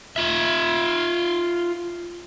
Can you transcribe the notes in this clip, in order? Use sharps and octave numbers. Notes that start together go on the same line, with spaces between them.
F4 E5